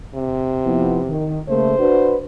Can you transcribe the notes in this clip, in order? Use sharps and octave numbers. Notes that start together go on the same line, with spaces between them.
C3
F3 B3 E4
D#3
C#3 A3 A#3 C5
D4 F#4 B4